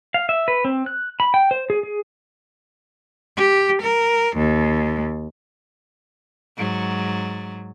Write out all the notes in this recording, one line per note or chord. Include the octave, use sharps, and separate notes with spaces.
F5
E5
B4
C4
F#6
B5
G5
C5
G#4
G#4
G4
A#4
D#2
G#2 F#3